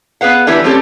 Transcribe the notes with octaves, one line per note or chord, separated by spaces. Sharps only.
B3 G#4 B4 F5 F#5
D3 E3 G3 E4 B4
G3 A3 C4 C#4 G4 A4